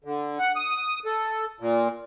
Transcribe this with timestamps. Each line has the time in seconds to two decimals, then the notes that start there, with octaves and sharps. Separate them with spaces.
0.04 D3
0.39 F#5
0.56 D#6
1.05 A4
1.60 A#2